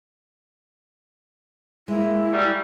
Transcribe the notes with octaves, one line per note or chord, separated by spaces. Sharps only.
G#3 A#3 E4
F#3 G3